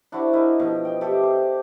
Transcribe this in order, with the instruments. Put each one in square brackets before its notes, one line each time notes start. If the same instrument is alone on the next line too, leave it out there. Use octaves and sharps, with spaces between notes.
[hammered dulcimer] D4 E4 F#4 C5
E4 A#4 D#5
B2 F3
G5
G4 A4 D5 E5
C5